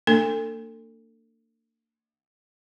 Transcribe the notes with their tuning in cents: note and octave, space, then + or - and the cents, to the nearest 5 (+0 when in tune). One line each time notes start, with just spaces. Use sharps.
A#3 -35 D4 +15 A4 +35